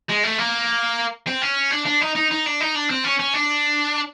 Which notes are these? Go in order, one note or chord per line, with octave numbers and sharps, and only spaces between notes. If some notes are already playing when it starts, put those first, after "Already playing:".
G#3
A3
A#3
C4
C#4
D4
D4
D#4
D#4
D#4
D4
D#4
D4
C4
C#4
C#4
D4